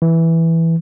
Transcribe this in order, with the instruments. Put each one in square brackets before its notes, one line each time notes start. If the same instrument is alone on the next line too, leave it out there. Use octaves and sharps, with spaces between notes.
[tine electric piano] E3